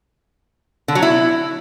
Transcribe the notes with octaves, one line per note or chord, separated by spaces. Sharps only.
D3
F#3
E4